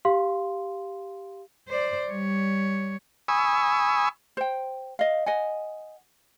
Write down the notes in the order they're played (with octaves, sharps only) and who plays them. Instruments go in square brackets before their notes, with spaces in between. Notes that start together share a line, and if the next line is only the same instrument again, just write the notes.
[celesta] G4 F5 C6
[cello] C5 D5
G3 C#5
[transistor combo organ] G#5 B5 C#6 D#6 E6
[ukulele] C5 G5
D#5 F5
D#5 F#5 G#5